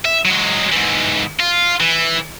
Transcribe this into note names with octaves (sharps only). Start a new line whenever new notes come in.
E5
F#3 G#3
G#2 E3
F4
E3